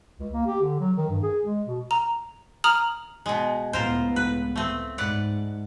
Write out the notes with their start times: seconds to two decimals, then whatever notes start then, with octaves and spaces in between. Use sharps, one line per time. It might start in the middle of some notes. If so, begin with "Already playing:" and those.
0.19 C#2
0.33 A#3
0.46 G4
0.62 D3
0.80 F#3
0.97 D#3
1.09 G2
1.23 G#4
1.45 G#3
1.67 B2
1.91 A#5
2.64 A#5 D#6 F6 F#7
3.26 B2 G#3
3.73 C#2 A2 B3 F4 A#4 C5
4.16 B4
4.56 A3 C4
4.98 G#2 B4 D5 F#5